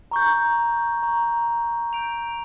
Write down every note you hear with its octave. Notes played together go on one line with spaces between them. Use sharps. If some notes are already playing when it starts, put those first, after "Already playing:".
A#5 C#6 G6
A#5 C#6 G6
G6 D7 F7